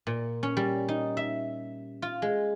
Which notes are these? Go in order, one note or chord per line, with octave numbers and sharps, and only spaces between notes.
A#2
C#4
G3
D#4
E5
F4
G#3